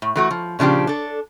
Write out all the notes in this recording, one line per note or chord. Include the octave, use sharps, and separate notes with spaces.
A2
E3 A3 F#4
F3
A#2 C#3 F3 D4 G4
D4 A4